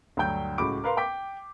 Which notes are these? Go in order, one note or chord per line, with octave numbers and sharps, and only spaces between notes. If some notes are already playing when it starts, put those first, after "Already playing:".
D2 G2 F#3 G5 G6
C#2 A2 F#4 B5 D6 D7
A#4 B4 F5 A#5 C6
G5 D6 B6